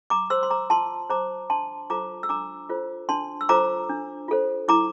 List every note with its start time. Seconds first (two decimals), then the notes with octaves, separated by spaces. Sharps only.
0.10 A#5 D6
0.30 C5 C6 E6
0.43 C6
0.50 A#5 D6
0.70 F4 A5 C6
1.10 C5 A#5 D6
1.50 D4 A5 C6
1.90 F4 A4 C5 A#5 D6
2.23 E6
2.29 D4 A#5 D6
2.70 F4 A4 C5
3.09 D4 A5 C6
3.41 E6
3.49 F4 A4 C5 A#5 D6
3.89 D4
4.28 F4 A4 C5
4.68 E4 A#5 D6